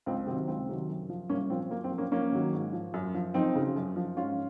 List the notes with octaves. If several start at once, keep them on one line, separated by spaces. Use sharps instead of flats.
C#2 C4
C3 D#3 F#3 C4
C#2 C4
C3 D#3 F#3
F#2
F3
C2 A#3 C#4
A#2 F3 C4
F#2 A#3
C4
F3
A#3 C#4
F2 A#3 C#4
D#3 F#3
G#2
F3
F#2
F3
F2 C4 D#4
C#3 F#3
F#2
F3
G#2 C#4 F4